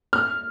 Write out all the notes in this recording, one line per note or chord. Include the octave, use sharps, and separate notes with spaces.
F6